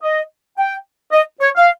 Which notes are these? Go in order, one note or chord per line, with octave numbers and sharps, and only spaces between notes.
D#5
G5
D#5
C#5
F5